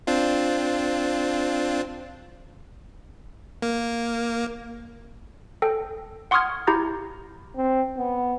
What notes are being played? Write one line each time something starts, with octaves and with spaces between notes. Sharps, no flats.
C4 D4 F4
A#3
A4 G5
F#5 C6 C#6 D#6 F6 G#6
E4 G4 A#5 G6 A6
C4
B3